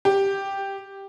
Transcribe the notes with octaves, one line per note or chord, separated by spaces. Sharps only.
G4